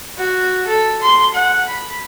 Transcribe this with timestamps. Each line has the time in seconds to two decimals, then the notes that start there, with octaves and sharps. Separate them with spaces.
0.18 F#4
0.67 A4
1.02 C6
1.34 F#5
1.69 B5